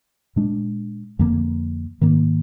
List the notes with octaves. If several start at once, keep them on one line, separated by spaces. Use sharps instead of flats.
A#2 G#3 D4
F2 D3 F3 A#3
G#2 D#3 A#3